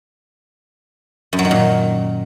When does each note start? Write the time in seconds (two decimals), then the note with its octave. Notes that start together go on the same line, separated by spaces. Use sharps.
1.33 F#2
1.39 F#3
1.45 D#3
1.51 A#2